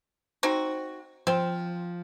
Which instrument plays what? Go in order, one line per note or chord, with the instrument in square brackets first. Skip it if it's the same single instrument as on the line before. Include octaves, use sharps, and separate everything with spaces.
[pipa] C4 D#4 F#4
[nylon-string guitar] F3 [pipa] C4